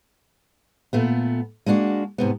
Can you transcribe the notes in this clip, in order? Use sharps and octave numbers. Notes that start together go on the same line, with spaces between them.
A#2 A3 B3
G#3 A#3 D4 F#4
G#2 C3 B3